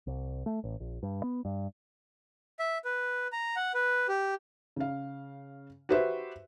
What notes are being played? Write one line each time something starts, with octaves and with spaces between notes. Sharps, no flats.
C2
A3
A1
A#1
G2
B3
G2
E5
B4
A#5
F#5
B4
G4
C#3 F5
F#4 G4 B4 C5 E5